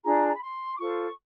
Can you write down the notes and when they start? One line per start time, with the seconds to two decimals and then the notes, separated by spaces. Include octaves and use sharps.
0.05 D4 F4 G#4 A#5
0.27 A#5
0.35 B5
0.42 C6
0.75 D6
0.79 F4 A4 C5 C#6